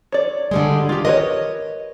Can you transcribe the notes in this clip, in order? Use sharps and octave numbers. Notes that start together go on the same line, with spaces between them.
C#5 D5
D3 G3 G#3
D#3 F4 G4
A#4 B4 C#5 D#5